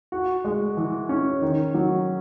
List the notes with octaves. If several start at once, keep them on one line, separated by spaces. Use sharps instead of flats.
F#4
G#3
E3
C#4
D#3
F#3